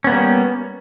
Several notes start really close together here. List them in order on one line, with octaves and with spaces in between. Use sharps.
C#4 B3 A#3 G3